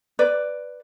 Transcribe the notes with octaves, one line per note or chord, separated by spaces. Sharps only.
B4 D5